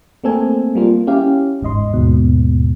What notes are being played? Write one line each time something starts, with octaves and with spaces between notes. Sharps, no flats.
A3 A#3 C4 A4 G#5
G3 A#3 F4
C#4 E4 G4 F5
G1 E2 G#2 D#5 C6
D#2 G#2 B2